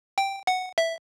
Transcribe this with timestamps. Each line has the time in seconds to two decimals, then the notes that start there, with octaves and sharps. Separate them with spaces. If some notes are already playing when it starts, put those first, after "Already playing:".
0.18 G5
0.47 F#5
0.78 E5